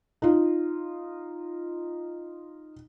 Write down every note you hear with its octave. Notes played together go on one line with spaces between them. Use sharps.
D#4 F4